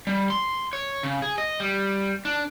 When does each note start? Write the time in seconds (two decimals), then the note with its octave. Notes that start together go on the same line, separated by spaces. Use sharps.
0.07 G3
0.30 C6
0.73 C#5
1.03 C#3
1.22 G#4
1.38 D#5
1.60 G3
2.25 D4